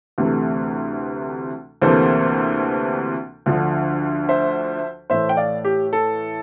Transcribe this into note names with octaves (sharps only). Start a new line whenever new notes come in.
D2 C3 E3 A3
D2 C3 E3 A#3 A4 C5
D2 D3 F3
C5 E5
A2 E3 A3 C5 E5
G5
D5 F5
G4
A4